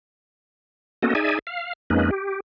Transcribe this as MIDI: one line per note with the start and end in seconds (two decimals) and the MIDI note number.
1.03 1.14 58
1.03 1.14 59
1.03 1.14 61
1.03 1.14 66
1.03 1.14 69
1.03 1.14 75
1.15 1.39 63
1.15 1.39 68
1.15 1.39 74
1.15 1.39 76
1.15 1.39 80
1.47 1.73 77
1.90 2.10 41
1.90 2.10 56
1.90 2.10 58
1.90 2.10 61
1.90 2.10 63
1.90 2.10 71
2.11 2.40 67